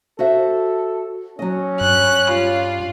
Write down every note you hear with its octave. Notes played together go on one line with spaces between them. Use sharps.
F#4 A4 C5 E5
F#3 C#4 D#5
G2 F#6
G3 F4